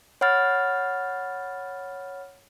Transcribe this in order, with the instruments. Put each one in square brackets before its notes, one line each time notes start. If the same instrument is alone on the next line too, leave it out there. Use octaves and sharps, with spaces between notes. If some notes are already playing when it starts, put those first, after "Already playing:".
[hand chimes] C#5 F#5 B5 F6 A6